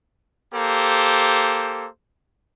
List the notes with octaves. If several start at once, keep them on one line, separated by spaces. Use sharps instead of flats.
A#3 G4 A4 C5